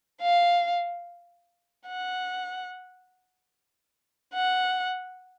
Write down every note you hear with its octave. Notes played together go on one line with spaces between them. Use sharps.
F5
F#5
F#5